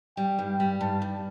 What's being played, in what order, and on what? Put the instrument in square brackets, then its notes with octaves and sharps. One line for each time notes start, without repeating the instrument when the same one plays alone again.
[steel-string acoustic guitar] G3 [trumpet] G5
[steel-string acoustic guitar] G2
[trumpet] G5
[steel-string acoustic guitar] G3
[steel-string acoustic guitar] G2 [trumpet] A5
[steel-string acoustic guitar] G2